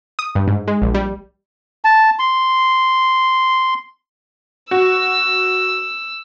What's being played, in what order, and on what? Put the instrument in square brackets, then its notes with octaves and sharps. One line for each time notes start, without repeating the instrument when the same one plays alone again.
[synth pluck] D#6
G2
G#2
G#3
A#1
G3
[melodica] A5
C6
[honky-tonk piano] F#4 [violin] E6